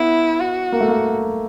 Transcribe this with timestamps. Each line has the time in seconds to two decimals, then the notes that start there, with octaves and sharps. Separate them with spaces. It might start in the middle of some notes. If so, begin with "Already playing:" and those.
Already playing: B3 E4
0.41 F#4
0.72 A#3
0.81 A3
0.88 A#3